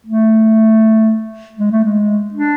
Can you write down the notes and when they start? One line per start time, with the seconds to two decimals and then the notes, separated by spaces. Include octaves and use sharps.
0.06 A3
1.58 G#3
1.71 A3
1.84 G#3
2.34 D4